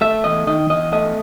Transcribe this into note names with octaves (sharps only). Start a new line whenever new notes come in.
A3 E5
E2 D#5
D#3 D#5
E2 D#5
A3 D#5